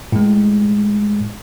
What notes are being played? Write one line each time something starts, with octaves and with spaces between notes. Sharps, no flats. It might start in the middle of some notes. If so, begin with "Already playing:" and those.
A2 G#3